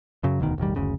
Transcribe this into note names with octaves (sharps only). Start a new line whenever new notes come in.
F#2 C#3 F#3
E1 D2 B2 D#3
E1 A1 D#3 G3
F#1 D2 C#3